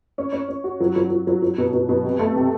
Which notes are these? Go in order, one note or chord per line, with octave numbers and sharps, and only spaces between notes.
C#4
C#4
C#4
F#4
F#3
F#3
F#3
F#3
F#3
B2
B2
B2
C3
A3
C3